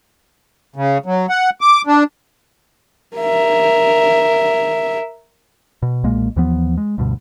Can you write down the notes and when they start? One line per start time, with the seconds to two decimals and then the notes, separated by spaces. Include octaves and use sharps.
0.76 C#3
1.06 F#3
1.29 F#5
1.61 D6
1.87 D4
3.16 A#4 E5
5.82 B2
6.03 B1 A#2 G#3 A#3
6.36 D#2 E3 F3 B3
6.78 G#3
6.98 D2 G2 B2